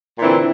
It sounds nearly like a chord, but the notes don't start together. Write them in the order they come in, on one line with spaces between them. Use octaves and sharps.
A#2 E3 C4 D3